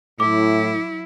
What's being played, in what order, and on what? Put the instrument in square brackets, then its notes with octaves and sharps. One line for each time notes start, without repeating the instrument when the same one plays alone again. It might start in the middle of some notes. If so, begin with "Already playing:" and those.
[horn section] A2 [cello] F#3 E4 [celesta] D6